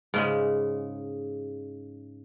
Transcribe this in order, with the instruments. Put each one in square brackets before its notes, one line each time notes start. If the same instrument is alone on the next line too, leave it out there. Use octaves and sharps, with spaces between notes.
[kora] G#2 C#3 G#3